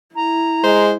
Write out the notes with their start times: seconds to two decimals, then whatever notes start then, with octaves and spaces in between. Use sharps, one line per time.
0.16 E4 A#5
0.64 G#3 C5